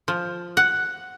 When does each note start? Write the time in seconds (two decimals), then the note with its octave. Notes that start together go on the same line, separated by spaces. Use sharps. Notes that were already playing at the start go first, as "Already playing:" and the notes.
0.08 F3
0.57 F#5